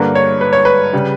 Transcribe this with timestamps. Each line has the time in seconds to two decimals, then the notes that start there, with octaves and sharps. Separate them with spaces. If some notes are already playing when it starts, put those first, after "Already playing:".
Already playing: G2 D3 A#3 D4 B4
0.15 C#5
0.41 B4
0.53 C#5
0.65 B4
0.93 C#3 G3